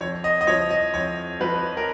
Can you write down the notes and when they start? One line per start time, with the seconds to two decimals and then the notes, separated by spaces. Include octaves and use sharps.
0.01 F2 C#5
0.24 D#5
0.41 D#5
0.47 F3 C#5
0.71 D#5
0.94 F2 C#5
1.40 F3 B4
1.77 A#4